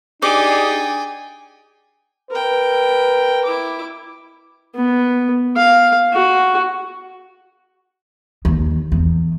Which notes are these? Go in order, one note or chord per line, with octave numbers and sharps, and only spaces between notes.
D4 D#4 G4 G#4 D5 G5 G#5
A#4 B4 G5
E4 D6
B3
F5
F#4
D#2
E2